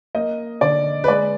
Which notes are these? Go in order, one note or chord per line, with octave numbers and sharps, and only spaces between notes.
A#3 D#5
D3 D5
B4
G#3 D5